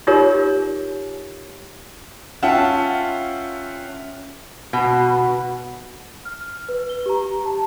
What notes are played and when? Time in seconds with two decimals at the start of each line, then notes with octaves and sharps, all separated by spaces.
0.07 D#4 F4 G4 A#4 C#5
2.43 C#4 F4 E5 F#5 G5 A5
4.73 B2
6.25 F6
6.69 B4
6.89 G7
7.06 G4 A#5
7.46 A5